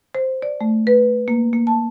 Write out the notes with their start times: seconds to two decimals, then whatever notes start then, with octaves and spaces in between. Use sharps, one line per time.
0.15 C5
0.42 D5
0.61 A3
0.87 B4
1.28 A#3
1.53 A#3
1.67 A5